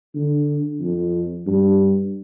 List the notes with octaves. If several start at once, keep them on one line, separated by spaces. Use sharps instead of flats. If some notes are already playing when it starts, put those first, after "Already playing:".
D3
F2
G2